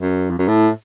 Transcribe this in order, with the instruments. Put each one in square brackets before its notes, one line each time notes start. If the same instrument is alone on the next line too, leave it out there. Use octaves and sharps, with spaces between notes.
[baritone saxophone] F#2
F2
F#2
A2